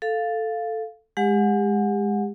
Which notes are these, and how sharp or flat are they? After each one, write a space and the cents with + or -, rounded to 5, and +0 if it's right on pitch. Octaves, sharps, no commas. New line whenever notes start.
A4 +0 F5 +0
G#3 +0 G4 +35 F#5 -20